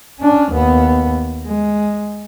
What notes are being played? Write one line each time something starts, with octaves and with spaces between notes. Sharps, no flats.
C#4 D4
D#2 B3
G#3